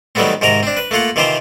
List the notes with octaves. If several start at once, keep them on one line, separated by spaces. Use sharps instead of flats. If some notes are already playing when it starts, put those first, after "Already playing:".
D#3 F#3 G3 A3 B3 C4
G#2 C3 D#3 A#4 A#5
C4 D4
B4
A3 A#3 F4 F#5
C3 D#3 E3 F4 G4 C5